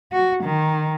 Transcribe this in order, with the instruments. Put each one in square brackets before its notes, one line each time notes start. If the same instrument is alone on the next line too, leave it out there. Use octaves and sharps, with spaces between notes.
[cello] F#4
D#3